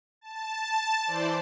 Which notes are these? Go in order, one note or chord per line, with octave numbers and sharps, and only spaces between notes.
A5
E3 C5 D5